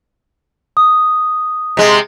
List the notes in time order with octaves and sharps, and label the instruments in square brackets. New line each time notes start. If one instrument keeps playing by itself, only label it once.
[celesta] D#6
[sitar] C3 G#3